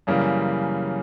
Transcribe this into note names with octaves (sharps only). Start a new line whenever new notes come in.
F#2 C#3 E3 G3 A#3